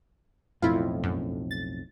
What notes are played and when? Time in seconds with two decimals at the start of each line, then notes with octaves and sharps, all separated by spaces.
0.62 B1 F2 A2 E4 F4
1.03 F#2
1.51 A6